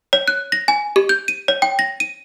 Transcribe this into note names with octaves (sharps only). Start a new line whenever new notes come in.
C#5
F#6
A#6
G#5
G4
G6
D#7
C#5
G5
A#6
D#7